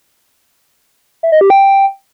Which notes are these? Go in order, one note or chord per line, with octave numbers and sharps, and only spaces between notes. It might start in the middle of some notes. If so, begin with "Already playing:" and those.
E5
D#5
G4
G5